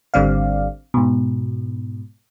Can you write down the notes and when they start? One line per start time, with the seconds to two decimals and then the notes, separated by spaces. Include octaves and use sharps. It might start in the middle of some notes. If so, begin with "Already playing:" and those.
0.14 G#1 D3 G3 C4 D5 F5
0.94 G#2 B2